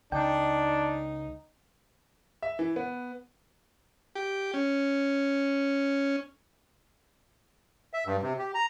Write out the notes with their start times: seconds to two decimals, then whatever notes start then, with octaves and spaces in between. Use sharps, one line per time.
0.12 C#2 D4 D#4 G5
2.43 E5
2.59 E3
2.76 B3
4.15 G4
4.54 C#4
7.93 E5
8.06 G2
8.23 C3
8.39 G4
8.54 A#5